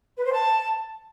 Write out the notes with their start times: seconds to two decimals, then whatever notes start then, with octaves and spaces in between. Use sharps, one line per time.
0.17 B4
0.24 C5
0.31 A5